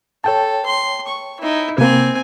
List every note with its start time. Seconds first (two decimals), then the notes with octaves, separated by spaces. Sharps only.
0.24 A4 C#5 G5 A5
0.65 C6
1.07 C#6
1.40 D#4 E4
1.78 C3 A#3 C4 G#5